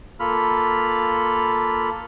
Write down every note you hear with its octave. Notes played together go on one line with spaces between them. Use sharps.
A#3 F4 A4 B5 F6